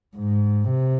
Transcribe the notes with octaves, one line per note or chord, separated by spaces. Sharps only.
G#2
C3